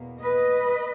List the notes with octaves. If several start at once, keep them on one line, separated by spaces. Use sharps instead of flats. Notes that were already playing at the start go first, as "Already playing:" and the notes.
Already playing: E2 B2 A#3
B4 D#5